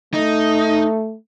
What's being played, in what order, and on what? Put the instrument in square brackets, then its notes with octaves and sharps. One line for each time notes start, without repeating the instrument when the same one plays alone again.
[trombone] A3 [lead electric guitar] D#4